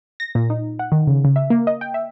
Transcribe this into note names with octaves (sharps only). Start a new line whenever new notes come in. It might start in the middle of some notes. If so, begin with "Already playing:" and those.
A#6
A#2
D#4
F#5
D#3
C#3
C#3
E5
A#3
D#5
G5
E5